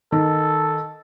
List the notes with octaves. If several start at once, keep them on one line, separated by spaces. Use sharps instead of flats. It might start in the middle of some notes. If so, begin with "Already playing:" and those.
D#3 A4